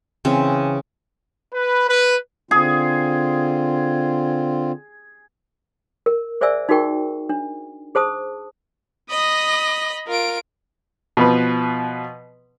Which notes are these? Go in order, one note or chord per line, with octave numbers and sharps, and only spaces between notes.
C#3 E3 C4
B4
B4
D3 C4 F4 G#4
A#4
G#4 C5 D5 E5 G#5 E6
D#4 F#4 G#4 A#4 G5 C#6
D4
G#4 C5 A5 D#6
D#5 B5 D#6
F4 A#4 D7
B2 F3 B3 B4